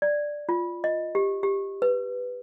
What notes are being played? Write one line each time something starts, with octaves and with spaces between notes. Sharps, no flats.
D5
F4
D#5
G4
G4
B4